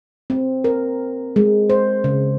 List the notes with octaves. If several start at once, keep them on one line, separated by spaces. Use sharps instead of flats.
C4
A#4
G#3
C5
C#3